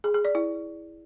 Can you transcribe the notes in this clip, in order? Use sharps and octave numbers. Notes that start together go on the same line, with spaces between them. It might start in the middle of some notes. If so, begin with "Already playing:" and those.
G#4
G#4
D5
E4